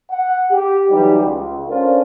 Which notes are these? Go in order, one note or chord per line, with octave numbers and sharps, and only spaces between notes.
F#5
G4
E3 F#3 G3 D#4 G4
C#2
C#4 D4 F4 A4 A#4 C5